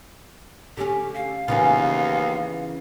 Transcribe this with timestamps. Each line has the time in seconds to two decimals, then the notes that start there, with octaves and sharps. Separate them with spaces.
0.77 D3 C#4 G4
1.14 F5
1.48 D#2 C#3 E3 B3 C#4 F4